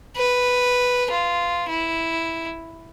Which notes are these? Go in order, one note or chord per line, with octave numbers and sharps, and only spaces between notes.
B4
F4
E4